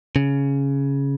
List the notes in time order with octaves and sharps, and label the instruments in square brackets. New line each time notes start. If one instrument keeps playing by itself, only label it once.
[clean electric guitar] C#3